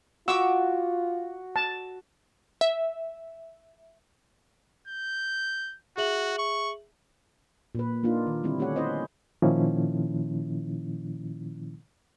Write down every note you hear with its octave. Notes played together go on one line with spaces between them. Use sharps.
F4 F#4 F#5 C#6 D6 E6
A5
E5
G6
F#4 G#4 E5 F#7
C#6
A#2 B4
A#3 D4 D#4 F4
D#3
D3 G3 C4 E4
A3 C#4 G4 C#5 F#5
C#4 E4 B4 C5 D#5
A#2 D#3 F3 A#3 C#4 E4